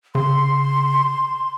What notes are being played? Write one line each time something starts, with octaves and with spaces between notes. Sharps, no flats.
C#3 C6